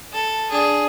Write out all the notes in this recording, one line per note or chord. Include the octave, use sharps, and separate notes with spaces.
A4
D4 G#4